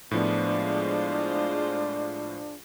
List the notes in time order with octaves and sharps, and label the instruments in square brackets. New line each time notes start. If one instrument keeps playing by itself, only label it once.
[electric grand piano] A2 F3 B3 [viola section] G#3 F4 C5 [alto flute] D4